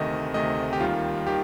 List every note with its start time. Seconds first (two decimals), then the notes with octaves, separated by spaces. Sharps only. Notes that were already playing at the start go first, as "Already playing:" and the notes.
Already playing: D2 C3 D#3 A3 D#5
0.34 D2 C3 D#3 A3 D#5
0.73 G4
0.80 D#2 D#3 G3 F4
1.27 D#3 G4